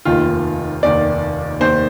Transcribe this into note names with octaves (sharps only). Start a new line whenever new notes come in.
F1 D#2 D#3 F4
F1 D#2 D#3 D5
F1 D#2 D#3 C5